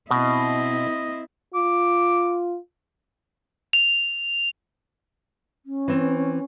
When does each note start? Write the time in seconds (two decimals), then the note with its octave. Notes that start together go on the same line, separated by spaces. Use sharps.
0.11 B2 C4 E4 D#5
1.54 F4 D6
3.73 F7
5.66 C#4
5.88 E3 C4